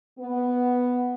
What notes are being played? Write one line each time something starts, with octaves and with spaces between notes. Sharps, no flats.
B3